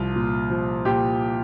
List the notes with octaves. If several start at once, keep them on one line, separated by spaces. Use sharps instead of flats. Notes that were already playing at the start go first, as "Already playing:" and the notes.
Already playing: C2 F3 F4
A#2
F3
A#2 G4